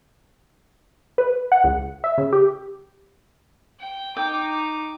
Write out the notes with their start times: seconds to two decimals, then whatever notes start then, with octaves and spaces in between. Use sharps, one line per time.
1.18 B4
1.52 F#5
1.64 C#2
2.04 E5
2.18 C#3
2.33 G4
3.80 G5
4.17 D#4 G5 D6